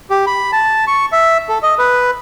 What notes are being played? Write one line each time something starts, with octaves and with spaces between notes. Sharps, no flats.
G4
B5
A5
C#6
E5
A4
D#5
B4